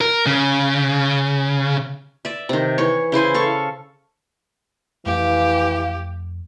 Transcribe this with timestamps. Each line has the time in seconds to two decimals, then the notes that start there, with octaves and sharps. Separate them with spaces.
0.01 A#4
0.26 C#3
2.25 D5 E5
2.49 C3 D#3
2.78 E3 C#5
3.12 C#3 E4 C5 G#5
3.34 A4 F5 C#6
5.06 F2 E3 A3 G4 F5